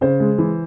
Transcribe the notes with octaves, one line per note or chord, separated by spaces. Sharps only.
C#3 C5
G#3
E3